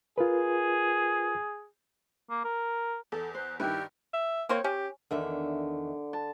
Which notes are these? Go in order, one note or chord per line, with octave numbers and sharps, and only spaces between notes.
F4 G#4 A#4 B4
A#3
A#4
E2 A4
C5 F#6
G2 D#3 E4 G4 B4
E5
A#3 C4 C5 C#5
C#4 G4
E2 D3 D#3 E5
A5